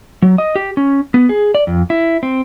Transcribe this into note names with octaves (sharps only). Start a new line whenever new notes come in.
F#3
D#5
G4
C#4
B3
G#4
D5
F2
E4
C4